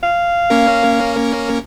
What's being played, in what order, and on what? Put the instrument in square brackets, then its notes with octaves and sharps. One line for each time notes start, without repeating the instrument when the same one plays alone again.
[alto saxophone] F5
[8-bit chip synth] A#3 C#4 A#4